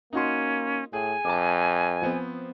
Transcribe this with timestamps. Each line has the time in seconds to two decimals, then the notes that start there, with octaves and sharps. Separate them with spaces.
0.13 A#3 C#4 D#4 F#4 C6
0.93 A2 G#4 G5 G#5
1.25 F2 A5 D6
2.02 F3 B3 C4